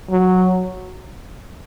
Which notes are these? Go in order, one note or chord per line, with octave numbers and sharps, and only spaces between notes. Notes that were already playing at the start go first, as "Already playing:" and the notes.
F#3